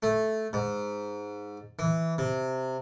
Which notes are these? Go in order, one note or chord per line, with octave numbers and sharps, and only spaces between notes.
A3
G#2
E3
C3